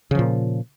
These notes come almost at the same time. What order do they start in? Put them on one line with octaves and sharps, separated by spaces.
C#3 F3 A#2